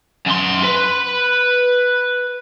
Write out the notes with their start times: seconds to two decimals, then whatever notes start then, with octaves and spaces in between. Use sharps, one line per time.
0.26 F#2 C6
0.63 B4